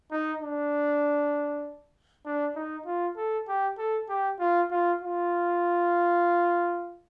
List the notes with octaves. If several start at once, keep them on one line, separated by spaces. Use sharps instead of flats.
D#4
D4
D4
D#4
F4
A4
G4
A4
G4
F4
F4
F4